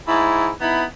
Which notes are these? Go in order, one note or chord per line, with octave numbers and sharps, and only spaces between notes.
G#2 E4
B3 D#4 E4